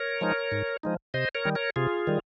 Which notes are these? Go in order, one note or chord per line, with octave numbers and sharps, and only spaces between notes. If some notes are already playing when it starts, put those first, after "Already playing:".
Already playing: A#4 C#5
F3 G#3 D#4
G#2
F3 G#3 D#4
C3 C5 D#5
A#4 C#5
D#3 G3
A#4 C#5
C3 F4 G#4
D#3 G3